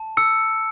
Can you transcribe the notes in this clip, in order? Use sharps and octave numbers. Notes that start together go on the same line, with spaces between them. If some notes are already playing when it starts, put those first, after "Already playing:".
Already playing: A5
E6 C#7